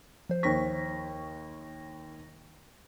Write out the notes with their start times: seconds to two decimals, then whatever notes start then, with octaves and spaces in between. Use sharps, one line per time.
0.29 F3 C5
0.43 D#2 C#6 A#6 B6